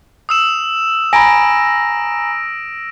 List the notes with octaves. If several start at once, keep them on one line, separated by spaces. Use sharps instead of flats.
D#6 E6 E7
G#5 A#5 B5 A#6 D7